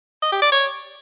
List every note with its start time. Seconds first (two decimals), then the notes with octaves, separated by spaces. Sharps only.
0.22 D#5
0.32 G4
0.42 D5
0.52 C#5